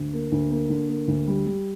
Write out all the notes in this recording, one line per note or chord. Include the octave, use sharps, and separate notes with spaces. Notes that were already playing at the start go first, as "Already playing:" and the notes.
Already playing: D2
A#3
D2
A#3
D3
A#3
D2
G3
G3